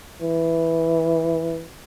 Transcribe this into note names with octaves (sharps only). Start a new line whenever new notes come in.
E3